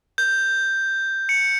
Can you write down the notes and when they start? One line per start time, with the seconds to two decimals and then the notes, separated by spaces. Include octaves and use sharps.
0.18 G6
1.29 C#7